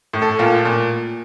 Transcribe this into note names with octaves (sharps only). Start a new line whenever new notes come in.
A2
A4
A#2 F4
A#2